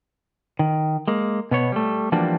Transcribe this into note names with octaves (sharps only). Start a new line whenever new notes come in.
D#3
G#3 A#3
B2 B3 C#5
G3 A3
E3 F3 G3 A#3 D4 F#4